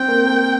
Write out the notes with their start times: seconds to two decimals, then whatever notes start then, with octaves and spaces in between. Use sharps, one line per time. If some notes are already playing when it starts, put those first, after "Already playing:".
Already playing: C4 G5
0.08 A#3
0.27 A#3